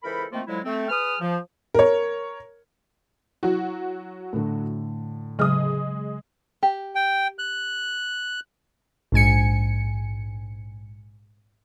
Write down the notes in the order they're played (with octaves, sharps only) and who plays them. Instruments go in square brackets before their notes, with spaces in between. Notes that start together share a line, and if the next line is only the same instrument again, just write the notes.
[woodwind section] C#2 E3 A4 A#4 C5 B5
D#3 F3 A3 A#3 C4 F4
D3 F3 F#3 G#3 E4
A3 C4
G#4 B4 D#6 F6
F3
[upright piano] A#4 C#5
[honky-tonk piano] F#3 F#4 [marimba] E4
[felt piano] A2 D3
[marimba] C#3 F#3 F6 [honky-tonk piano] G#3 D#6
[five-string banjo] G4
[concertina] G5
F#6
[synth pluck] A#1 G#2 G#5 C#7